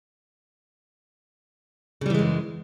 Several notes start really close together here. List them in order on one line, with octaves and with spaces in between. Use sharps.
C#3 G3 E3 G#3 F#2